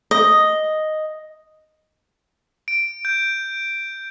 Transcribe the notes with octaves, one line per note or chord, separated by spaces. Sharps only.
D#5
D7
G6